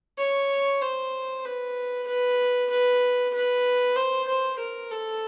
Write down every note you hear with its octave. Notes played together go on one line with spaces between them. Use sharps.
C#5
C5
B4
B4
B4
B4
C5
C5
A#4
A4